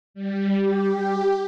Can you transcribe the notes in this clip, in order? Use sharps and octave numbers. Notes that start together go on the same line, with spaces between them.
G3
G4
G4